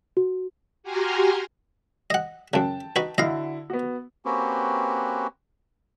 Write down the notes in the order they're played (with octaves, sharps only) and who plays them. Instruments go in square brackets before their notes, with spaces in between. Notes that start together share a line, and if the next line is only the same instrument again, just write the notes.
[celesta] F#4
[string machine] F#4 G4 G#5 A#5 C6 F6
[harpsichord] D#5 F#5
[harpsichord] F#2 C#3 [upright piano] G5 A5
[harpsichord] D#4 F#4 B4
[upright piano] D3 E4 F#4 [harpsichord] D#5 F5
[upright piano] B3 F#4
[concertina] A#3 C4 C#4 F#4 G4 B4